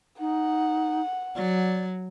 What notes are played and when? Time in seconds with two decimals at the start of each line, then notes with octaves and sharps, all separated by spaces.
0.20 D#4 F#5
1.36 F#3 D5